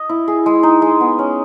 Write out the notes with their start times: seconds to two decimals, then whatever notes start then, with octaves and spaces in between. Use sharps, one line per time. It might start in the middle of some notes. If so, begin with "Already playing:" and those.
Already playing: D#5
0.09 E4
0.28 G#4
0.46 G#3
0.63 D#4
0.82 G#3
1.00 B3
1.19 C#4